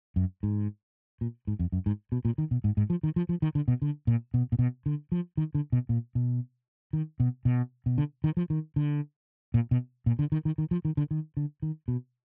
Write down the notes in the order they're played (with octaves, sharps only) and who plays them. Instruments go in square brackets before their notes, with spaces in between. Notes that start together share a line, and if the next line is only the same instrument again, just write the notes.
[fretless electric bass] F#2
G#2
A#2
G#2
F2
F#2
G#2
B2
A#2
D#3
B2
G#2
G#2
F3
D#3
F3
F3
D#3
D3
B2
D3
A#2
B2
A#2
B2
D3
F3
D#3
D3
B2
A#2
B2
D#3
B2
B2
B2
D3
D#3
F3
D#3
D3
A#2
B2
A#2
D3
D#3
D#3
D#3
F3
D#3
D3
D#3
D3
D#3
B2